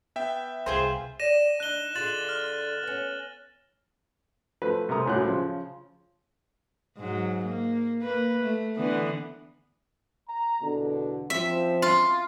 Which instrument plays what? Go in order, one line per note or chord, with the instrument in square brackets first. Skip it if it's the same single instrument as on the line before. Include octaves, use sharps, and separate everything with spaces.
[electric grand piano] B3 E5 G5
[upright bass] C2 [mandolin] F4 G#4 C5
[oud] D5 [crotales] A#6 D#7 E7
[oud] D4 D#4 [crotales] F#6 G7
[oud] D3 G#3 F4 [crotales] F#6 A6 F#7
[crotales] F6
[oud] B3 C#4
[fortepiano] F3 A3 B4
C3 A3 A#4 A#5 D#6
C#2 F#2 A2 F#3 F#6
C#3 F3
[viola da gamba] G#2 F#3
A#3
A#3 B4
A3
D3 E3 B3
[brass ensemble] A#5
E2 B2 D3
[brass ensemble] F3 C4 [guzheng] E5
[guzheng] F4